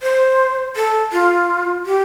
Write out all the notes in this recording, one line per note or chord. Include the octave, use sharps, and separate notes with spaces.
C5
A4
F4
G4